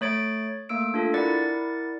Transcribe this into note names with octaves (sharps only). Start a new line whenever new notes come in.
A3 C#5 A6 D7
A3 A#3 E6 D7
D4 F4 A4
E4 A#4 D5 F#5 A6 C#7